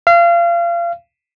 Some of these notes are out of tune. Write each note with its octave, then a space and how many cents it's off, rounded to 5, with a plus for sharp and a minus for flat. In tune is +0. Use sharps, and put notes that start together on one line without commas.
F5 -30